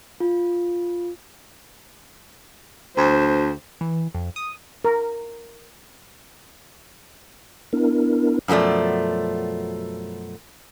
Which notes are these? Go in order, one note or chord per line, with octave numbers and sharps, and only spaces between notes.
F4
D2 C5
E3
F2
D#6
A#4
B3 D4 E4 A#4
F#2 B2 F3 A3 D5